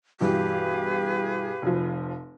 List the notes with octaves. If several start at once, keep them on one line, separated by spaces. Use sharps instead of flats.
G2 B2 E3 G4 G#4 B4 F5
F1 F3